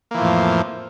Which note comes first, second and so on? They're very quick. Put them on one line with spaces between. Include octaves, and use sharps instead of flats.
A#3 E3 F3 A2 F2